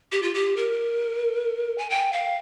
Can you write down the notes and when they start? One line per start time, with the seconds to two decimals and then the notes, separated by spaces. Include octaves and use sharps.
0.12 G4
0.22 F4
0.34 G4
0.57 A#4
1.78 G#5
1.90 G5
2.13 F5